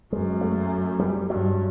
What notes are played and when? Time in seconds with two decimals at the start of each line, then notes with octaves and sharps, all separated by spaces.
0.12 F#2 G#3
0.41 A3
0.99 G3
1.30 G2 F#3